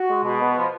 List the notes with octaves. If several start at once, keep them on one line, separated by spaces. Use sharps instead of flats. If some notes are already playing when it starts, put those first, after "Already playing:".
Already playing: F#4
G#3
B2
B3
F3